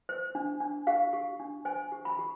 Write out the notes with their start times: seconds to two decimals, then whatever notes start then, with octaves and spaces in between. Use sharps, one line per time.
0.09 C5
0.35 D4
0.60 D4
0.87 G4 F5
1.13 G4
1.39 D4
1.65 C5 G#5
1.92 G4
2.05 B5
2.19 G4